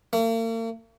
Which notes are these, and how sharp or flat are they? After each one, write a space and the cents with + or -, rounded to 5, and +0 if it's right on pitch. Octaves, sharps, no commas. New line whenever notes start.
A#3 -45